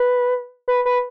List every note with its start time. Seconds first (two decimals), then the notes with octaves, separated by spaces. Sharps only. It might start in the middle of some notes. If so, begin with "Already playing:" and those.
Already playing: B4
0.68 B4
0.85 B4